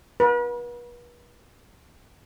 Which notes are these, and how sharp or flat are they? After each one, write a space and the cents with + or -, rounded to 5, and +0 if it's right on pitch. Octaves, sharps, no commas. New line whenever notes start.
B4 -40